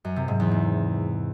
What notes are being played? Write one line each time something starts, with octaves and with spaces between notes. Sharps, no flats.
F#2
C3
G#2
E2
C3